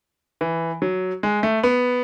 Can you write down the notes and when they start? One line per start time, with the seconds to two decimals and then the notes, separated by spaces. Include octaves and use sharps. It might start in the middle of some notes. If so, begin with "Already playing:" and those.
0.41 E3
0.82 F#3
1.23 G#3
1.43 A3
1.63 B3